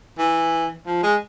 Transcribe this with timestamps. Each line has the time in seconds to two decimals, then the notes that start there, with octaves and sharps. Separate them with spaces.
0.18 E3
0.86 F3
1.03 G#3